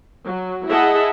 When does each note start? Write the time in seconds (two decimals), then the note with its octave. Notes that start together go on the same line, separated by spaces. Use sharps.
0.23 F#3
0.67 E4 G#4 D#5 E5 F#5 A5